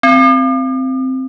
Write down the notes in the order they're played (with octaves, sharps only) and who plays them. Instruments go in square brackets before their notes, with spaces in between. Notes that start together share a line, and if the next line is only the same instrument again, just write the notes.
[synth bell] C4